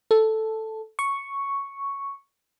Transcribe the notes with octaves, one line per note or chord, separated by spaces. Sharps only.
A4
C#6